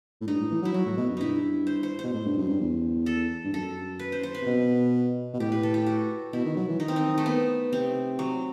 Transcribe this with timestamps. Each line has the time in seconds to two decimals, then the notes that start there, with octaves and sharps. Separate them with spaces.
0.21 A2
0.27 G2 D#4
0.40 A2
0.51 E3
0.62 F#3
0.65 E4
0.74 F#3 F#4
0.86 A2
0.97 B2
1.09 F#2
1.17 G2 D#4 E4
1.67 C5
1.83 C5
1.99 B2 C5
2.14 A2
2.25 G2
2.37 F#2
2.49 G2
2.61 E2
3.06 A4
3.44 G2
3.54 F#2 A4
3.99 B4
4.12 C5
4.23 C5
4.35 B4
4.42 C3
4.46 B2
5.33 B2
5.40 A2 G4
5.52 B4
5.63 A4
5.74 G4
5.87 F#4
6.33 B2 E4
6.45 D#3
6.56 F#3
6.68 E3
6.80 D#3 D#4
6.88 C4
6.96 D#4
7.18 A3
7.26 B3
7.72 C3 C4
8.19 F#3